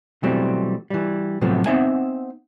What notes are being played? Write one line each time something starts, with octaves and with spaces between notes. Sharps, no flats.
B2 E3 F#3 G3 A3 C4
E3 G3
A2 C3 F3 F#3 A3 B3
B3 C4 D#4 E5 F#5 G#5